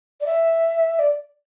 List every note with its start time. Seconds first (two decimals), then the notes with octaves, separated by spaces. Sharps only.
0.21 D5
0.26 E5
0.99 D5